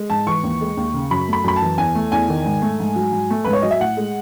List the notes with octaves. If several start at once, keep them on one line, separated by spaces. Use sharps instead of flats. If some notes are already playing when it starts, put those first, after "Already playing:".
Already playing: G#3
G#2 A5
E3 C#6
D#2
G#3
D#2
C#3
F#2 B5
A3 B5
F#2 B5
A5
E3
E2 G#5
A3
E2 G#5
D#3
G#2
A3
G#2
F#3
G#2
A3
G#2 B4
C#5
F#3 D#5
E5
A2 F#5
G#3